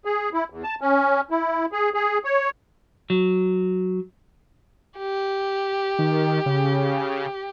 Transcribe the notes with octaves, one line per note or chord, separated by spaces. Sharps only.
G#4
E4
E2
A5
C#4
E4
G#4
G#4
C#5
F#3
G4
D#3
C#3